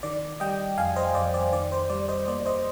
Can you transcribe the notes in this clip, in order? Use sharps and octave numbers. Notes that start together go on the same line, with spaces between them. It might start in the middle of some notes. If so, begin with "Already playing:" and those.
D#3 D5
G3 D#5 G5
F2 F5 G#5
C5 D#5
F2 D5
D5
D#3 D5
C5
G3 D5
C5 D#5
A#3 D5
C5 D#5